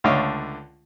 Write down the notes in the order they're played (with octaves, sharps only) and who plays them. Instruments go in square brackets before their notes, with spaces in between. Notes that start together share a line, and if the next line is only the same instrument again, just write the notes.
[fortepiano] C#2 D3 A3 C#5 D#5 F5